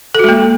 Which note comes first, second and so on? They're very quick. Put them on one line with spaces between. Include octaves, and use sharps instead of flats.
A4 F#4 G#3 A#3